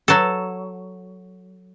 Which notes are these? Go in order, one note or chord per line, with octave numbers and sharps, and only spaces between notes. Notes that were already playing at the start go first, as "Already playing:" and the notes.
F#3 A4